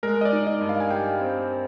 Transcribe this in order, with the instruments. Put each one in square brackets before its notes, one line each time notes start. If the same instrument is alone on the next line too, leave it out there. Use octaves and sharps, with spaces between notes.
[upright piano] G#3 [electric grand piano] A#4
[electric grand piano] D#5
D5
[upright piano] D#4
[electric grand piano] D#5
[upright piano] G2
[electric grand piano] F5
G#5
[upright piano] G3 [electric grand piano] G5
[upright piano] C4